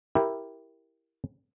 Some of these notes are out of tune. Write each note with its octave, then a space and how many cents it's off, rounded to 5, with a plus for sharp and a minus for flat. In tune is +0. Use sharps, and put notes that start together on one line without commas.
E4 +0 G4 +0 A#4 +0